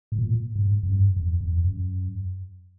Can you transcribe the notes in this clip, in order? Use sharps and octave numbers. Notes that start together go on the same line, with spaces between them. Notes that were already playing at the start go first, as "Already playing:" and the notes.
A2
A#2
G#2
F#2
G2
F2
F2
F#2